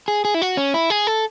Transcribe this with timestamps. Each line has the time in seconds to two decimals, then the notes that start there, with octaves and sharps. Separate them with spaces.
0.08 G#4
0.25 G#4
0.34 E4
0.42 F#4
0.57 C#4
0.74 E4
0.90 G#4
1.07 A4